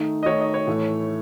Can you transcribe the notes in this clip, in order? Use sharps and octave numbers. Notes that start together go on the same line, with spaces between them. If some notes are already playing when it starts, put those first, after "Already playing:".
Already playing: D#3 A3 D#4
D#5
D#3 A3 D#4 C#5
D#5
C#5
A2 E3 A3